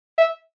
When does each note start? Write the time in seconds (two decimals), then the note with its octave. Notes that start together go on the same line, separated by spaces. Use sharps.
0.18 E5